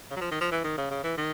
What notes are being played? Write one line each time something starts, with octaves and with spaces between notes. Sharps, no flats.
C#3
F#3
F3
D#3
F3
E3
D#3
C#3
C#3
E3
D#3